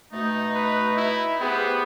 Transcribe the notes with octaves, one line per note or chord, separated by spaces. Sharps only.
B2 A3 D#4
B4
E4
B3 G4 G#4 C5